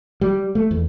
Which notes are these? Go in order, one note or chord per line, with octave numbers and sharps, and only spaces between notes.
G3
A3
E2